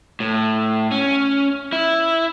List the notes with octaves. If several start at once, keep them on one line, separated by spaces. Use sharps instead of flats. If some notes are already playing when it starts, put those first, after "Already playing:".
A2
C#4
E4